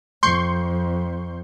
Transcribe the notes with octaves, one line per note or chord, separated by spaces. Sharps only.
F2 C6 C#6 G6